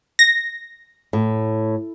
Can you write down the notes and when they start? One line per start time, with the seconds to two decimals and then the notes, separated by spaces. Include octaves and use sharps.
0.19 A#6
1.13 A2